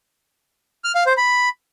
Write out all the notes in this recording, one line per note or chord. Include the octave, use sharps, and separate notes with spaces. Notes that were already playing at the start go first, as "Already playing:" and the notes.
F6
F5
C5
B5